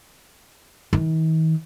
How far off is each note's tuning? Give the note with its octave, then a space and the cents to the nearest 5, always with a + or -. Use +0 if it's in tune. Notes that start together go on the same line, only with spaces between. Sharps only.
D#3 +45